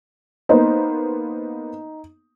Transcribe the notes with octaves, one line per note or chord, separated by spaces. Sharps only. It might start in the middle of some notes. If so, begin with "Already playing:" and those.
A#3 B3 D#4 C5